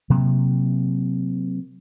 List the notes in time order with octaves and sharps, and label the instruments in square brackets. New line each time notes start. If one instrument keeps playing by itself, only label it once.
[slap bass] C3 F#3 A#3